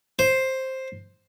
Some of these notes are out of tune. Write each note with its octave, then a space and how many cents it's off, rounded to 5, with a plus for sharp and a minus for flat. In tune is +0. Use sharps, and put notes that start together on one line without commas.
C5 +5